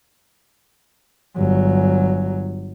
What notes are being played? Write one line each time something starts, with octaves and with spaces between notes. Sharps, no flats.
G1 F#3